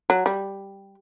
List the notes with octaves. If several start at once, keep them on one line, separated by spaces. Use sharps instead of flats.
F#3
G3